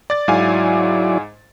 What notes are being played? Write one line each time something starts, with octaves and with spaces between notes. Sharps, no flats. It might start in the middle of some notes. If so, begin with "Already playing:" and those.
D5 A6
G#2 F#3 E4 D5 F5 G#5